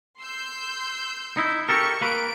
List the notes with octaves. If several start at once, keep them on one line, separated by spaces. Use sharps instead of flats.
C6 E6 G6
D#4 E4
G4 A4 A#4 C#6
A#3 B4 D7